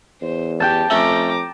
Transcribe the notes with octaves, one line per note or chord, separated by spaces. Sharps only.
E2 C5
G4 G5 A5
F2 A3 C#4 A#5 D6